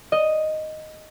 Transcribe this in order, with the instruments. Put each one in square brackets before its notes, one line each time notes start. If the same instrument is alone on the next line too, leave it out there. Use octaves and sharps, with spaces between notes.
[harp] D#5